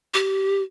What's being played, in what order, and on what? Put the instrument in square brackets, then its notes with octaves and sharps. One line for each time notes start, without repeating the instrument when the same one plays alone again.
[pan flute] G4